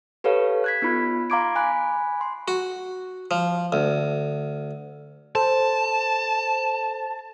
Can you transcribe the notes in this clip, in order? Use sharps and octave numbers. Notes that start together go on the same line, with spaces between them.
G4 A4 B4 C#5 F5
F#6 G#6 B6
B3 D#4 F4 B5
F5 A#5 C6 D6 G#6 D7
G#5 B5 F#6
C6
F#4
F3
D2
A4 C5 A5